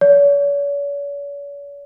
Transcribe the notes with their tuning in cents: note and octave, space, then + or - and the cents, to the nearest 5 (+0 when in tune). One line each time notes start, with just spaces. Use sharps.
C#5 +45